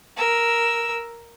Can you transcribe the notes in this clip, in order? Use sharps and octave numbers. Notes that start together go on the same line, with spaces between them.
A#4 E6